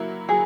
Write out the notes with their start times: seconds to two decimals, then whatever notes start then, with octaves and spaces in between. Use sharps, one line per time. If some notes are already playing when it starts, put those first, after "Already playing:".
Already playing: F#3 A#3 E4
0.28 F#3 G#4